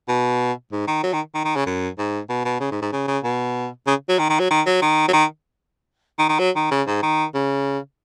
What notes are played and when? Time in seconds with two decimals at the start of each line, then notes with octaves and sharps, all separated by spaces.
0.08 B2
0.72 G#2
0.88 D#3
1.03 F#3
1.13 D#3
1.35 D#3
1.45 D#3
1.56 C#3
1.67 F#2
1.98 G#2
2.29 B2
2.45 B2
2.60 C#3
2.71 G#2
2.82 G#2
2.93 C#3
3.08 C#3
3.24 B2
3.87 C#3
4.09 F#3
4.19 D#3
4.30 D#3
4.40 F#3
4.51 D#3
4.67 F#3
4.82 D#3
5.08 F#3
5.13 D#3
6.19 D#3
6.29 D#3
6.39 F#3
6.56 D#3
6.71 C#3
6.88 G#2
7.03 D#3
7.35 C#3